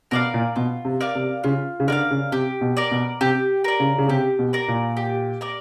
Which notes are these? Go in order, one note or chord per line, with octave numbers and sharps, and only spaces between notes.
B2 A#4 D5 F5
A#2
B2 F4
C3
A#4 D5 F5
C3
C#3 F4
C#3
D3 A#4 D5 F5
C#3
C3 G4
B2
A#4 D5
B2
C3 G4
A#4 D5
C#3
C#3
C3 G4
B2
A#4 D5
A#2
G4
A#4 D5